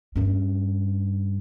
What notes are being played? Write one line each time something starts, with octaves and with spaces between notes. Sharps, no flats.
G2 C#4